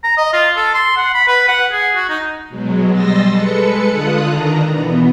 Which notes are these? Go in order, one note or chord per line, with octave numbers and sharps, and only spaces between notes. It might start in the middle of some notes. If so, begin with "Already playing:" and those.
A#5
D#5
F4
A4
C6
F#5
B5
B4
F#5
G#4
F#4
D#4
B2 F#3 G#3
G3 D#5 C6 E6 A6 A#6
G#3 A4 B4 C#7
D3 F4 A4 D#6 F#6
D#3 D4 A#5
B2 E3 B3